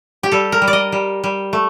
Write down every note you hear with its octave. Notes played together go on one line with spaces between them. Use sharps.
G4
G3 A4
A#4
G3
D5
D#5
G3
G3
A3